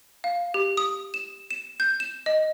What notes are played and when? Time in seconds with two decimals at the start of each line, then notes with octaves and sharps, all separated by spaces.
0.24 F5
0.54 G4
0.77 D#6
1.14 E7
1.51 E7
1.80 G6
2.00 E7
2.26 D#5